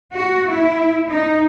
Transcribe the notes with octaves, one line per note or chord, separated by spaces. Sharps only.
F#4
E4
D#4